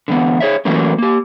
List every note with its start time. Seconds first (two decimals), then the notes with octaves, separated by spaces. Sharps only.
0.08 D3 E3 B3
0.40 G#4 C#5 E5
0.65 E3 F#3 A3 A#3 C#4
0.98 A#3 G4